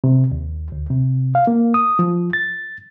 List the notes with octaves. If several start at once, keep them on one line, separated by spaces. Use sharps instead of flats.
C3
D#2
D2
C3
F5
A#3
D#6
F3
A6